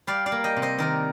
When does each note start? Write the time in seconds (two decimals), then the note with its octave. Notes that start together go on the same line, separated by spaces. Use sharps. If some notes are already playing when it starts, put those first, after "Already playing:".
0.07 G3 D5 F5
0.26 D5 F5
0.32 A#3
0.44 D#5 G5
0.56 C3
0.62 C5 D#5
0.78 D#3 A#4 D5